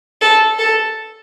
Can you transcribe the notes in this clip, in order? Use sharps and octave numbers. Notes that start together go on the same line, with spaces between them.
A4
A4